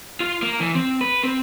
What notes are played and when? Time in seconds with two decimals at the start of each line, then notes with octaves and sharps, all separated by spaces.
0.20 F4
0.42 A#3
0.60 E3
0.75 C4
1.01 B4
1.24 C4